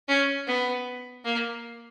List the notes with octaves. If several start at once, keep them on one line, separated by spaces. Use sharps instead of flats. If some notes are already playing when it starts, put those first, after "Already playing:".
C#4
B3
A#3